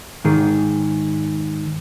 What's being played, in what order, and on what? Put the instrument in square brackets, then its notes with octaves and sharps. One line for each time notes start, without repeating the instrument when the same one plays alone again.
[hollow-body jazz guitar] G#2 D#3 G#4